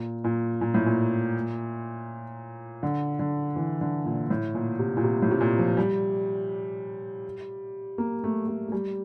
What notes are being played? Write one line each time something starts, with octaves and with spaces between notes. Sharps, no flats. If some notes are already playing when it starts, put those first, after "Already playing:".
Already playing: A#2
A#2
A#2
A2
A#2
D3
D3
E3
D3
A#2
A2
A#2
C3
A#2
C3
A2
C3
A#2
F3
G3
A#3
A3
A3
A3
G3